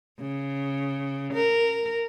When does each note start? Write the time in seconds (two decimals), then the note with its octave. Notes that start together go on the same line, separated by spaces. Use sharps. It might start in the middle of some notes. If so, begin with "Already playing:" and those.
0.21 C#3
1.34 A#4